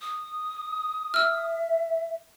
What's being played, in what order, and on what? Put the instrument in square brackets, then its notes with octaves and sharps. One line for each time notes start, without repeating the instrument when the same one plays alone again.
[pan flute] D#6
[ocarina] E5 [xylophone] E6 F6